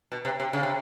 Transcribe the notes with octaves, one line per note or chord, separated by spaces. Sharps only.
B2
C3
C3
C#3
C3